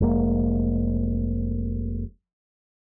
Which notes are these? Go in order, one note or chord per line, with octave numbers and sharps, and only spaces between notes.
F1 G#3 A#3